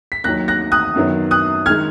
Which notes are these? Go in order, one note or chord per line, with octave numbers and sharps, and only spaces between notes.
B6
D#2 D#3 F#3 F#6 A#6
F#6 A#6
D#6 F#6
F#2 D#3 F#3 B3
D#6 F#6
D#3 G#3 F6 G#6